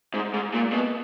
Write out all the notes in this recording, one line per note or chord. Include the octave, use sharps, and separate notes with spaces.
G#2
G#2
A#2
B2